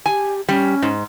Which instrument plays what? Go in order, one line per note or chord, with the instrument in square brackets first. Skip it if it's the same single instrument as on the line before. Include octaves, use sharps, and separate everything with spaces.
[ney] G4 [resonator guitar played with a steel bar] G#5
[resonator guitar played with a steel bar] G3 [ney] C#4
[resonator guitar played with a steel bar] G#2